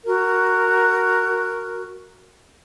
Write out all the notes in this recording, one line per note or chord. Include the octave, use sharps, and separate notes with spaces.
F#4 A#4